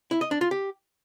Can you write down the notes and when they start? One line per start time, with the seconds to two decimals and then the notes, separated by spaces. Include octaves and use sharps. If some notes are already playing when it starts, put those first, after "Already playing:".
0.11 E4
0.21 D#5
0.31 D4
0.41 F4
0.51 G4